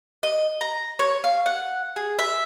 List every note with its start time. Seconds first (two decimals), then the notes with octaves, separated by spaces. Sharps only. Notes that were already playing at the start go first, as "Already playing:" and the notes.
0.23 D#5
0.61 A#5
0.99 C#5
1.24 F5
1.46 F#5
1.96 G#4
2.19 E5